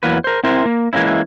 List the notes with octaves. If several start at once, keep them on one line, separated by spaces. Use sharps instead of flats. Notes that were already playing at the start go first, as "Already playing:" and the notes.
E2 E3 F#3 A#3 B4
A#4 C5
C4 E4 A#4 C5
A#3
E3 G#3 A#3 C#4 E4